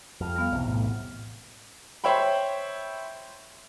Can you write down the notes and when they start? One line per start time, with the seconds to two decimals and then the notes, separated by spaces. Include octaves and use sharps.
0.21 F2 F6
0.36 G3 B3 F5
0.52 B1 E2 C3
0.66 A2
2.04 C5 C#5 E5 G5 B5